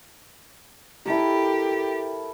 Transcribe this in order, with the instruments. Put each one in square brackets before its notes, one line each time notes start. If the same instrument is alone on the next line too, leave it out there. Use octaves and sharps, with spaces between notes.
[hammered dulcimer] E4 A4 A#4 [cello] G4